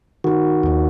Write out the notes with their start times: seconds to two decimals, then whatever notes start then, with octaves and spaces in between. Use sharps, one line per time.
0.24 D#3 F#4
0.63 D#2